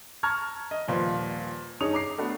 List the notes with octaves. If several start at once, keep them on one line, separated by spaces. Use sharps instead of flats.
A5 A#5 C#6 F6 G#6
D#5
D#1 A#2 F3 B4 C5
G2 D#4 G#4 C#5 D#6 F7
A#5 D6 C7
A3 B3 D4 F#4